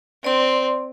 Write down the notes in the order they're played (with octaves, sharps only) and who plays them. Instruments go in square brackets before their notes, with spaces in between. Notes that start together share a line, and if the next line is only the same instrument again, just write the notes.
[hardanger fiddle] C4 [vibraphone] D5 C6